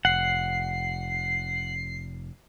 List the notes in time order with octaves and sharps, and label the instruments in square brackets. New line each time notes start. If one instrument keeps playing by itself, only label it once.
[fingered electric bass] F1 [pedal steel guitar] F#5 [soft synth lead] C7